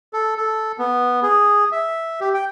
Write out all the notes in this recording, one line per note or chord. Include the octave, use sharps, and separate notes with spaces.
A4
A4
B3
G#4
E5
G4
G5